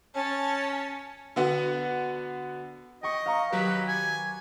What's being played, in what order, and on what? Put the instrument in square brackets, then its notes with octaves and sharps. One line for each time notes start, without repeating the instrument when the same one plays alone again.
[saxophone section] C#4 [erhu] A5
[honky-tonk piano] D3 B3 F#4
[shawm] D#5 [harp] G5 C#6
[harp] F5 A#5 C#6
[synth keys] D#3 F#3 G4 [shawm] B4
[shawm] G#5